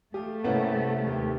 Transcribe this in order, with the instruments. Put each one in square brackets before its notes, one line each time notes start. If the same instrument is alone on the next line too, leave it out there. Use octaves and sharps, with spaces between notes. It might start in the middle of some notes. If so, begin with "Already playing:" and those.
[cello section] A3 [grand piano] G4 [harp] F5 G#5 D#6
[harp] G2 C3 G3 [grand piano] A#3 C#4 E4 [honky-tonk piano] B3
[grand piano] D#2 [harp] G4 G5